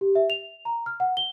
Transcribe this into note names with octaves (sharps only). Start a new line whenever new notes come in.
G4
E5
F7
A#5
F6
F#5
G7